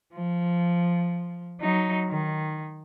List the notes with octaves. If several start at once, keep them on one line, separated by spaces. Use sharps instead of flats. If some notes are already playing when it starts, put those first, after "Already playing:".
F3
F#3 D#4
D#3